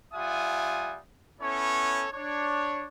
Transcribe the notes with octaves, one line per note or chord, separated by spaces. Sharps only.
G3 F4 E5 F#5 G#5 D#6
B3 C#4 E4 A4 C#5
D4 C#5